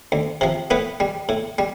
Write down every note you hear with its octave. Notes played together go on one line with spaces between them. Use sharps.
D2
C3 F3
A2 B3 B4
G3
A2
G3